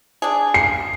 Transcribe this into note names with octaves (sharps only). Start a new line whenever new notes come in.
D4 G#4
C7